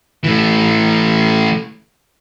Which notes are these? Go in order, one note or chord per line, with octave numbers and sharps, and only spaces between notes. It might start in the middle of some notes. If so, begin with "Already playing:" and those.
E3 A3